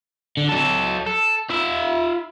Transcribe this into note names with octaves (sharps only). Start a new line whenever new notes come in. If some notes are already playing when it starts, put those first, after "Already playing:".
D3
F#3 A4
A4
F4 E5